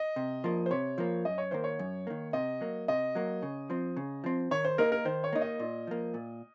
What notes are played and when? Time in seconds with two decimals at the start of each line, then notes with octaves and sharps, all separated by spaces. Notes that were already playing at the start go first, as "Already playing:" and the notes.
Already playing: D#5
0.16 C3
0.44 F3 A#3
0.66 C5
0.71 C3 C#5
0.98 F3 A#3
1.25 F#2 D#5
1.38 C#5
1.51 D#3 A#3 C5
1.64 C#5
1.79 F#2
2.07 D#3 A#3
2.33 C3 D#5
2.61 F#3 A#3
2.88 C3 D#5
3.15 F#3 A#3
3.42 C#3
3.70 F3 C4
3.97 C#3
4.24 F3 C4
4.51 D#3 C#5
4.65 C5
4.78 A#3 D#4 A#4
4.92 A#4
5.05 D#3 C5
5.24 C#5
5.33 A#3 D#4
5.42 D#5
5.59 A#2
5.87 F3 A#3
6.14 A#2